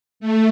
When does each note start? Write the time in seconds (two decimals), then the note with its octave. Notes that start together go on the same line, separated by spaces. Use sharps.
0.20 A3